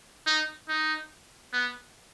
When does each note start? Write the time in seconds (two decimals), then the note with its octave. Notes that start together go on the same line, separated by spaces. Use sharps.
0.26 D#4
0.69 D#4
1.53 B3